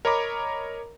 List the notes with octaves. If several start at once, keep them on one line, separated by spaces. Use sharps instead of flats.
A#4 C#5 D#5 A#5 B5 D6